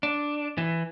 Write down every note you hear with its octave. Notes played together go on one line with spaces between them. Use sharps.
D4
E3